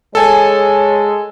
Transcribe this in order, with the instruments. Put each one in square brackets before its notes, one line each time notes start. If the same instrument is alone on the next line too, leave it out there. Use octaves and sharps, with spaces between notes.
[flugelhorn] G#3 [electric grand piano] A4 G#5 [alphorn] C#5